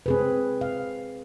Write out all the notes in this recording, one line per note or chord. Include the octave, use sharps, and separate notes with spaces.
C4 G#4 B4
F5